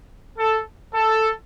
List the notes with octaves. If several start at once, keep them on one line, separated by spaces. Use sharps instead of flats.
A4
A4